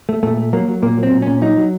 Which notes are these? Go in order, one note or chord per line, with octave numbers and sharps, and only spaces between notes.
A3
A#2 A3
A3
F#3 A#3
F#3
A#2 A#3
F#3
C4
A#2
A#2 C#4
F#3 D#4
F#3